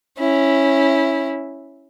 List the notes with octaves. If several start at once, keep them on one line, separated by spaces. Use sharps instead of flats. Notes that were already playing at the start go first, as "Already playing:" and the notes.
C#4 E4